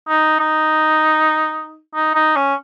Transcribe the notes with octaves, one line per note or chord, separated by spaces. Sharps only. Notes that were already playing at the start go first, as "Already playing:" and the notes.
D#4
D#4
D#4
D#4
C#4